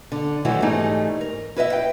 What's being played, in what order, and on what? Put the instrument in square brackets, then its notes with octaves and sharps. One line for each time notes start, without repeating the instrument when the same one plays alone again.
[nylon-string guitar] D3
D#3 E3 F#3 A3 E4 F#4
G#2 E3 G3 A3 D#4
A#4
E4 B4 D#5 E5
G5